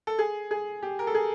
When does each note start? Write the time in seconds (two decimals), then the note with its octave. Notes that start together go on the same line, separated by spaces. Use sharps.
0.07 A4
0.19 G#4
0.51 G#4
0.83 G4
0.99 A#4
1.07 A4
1.15 G#4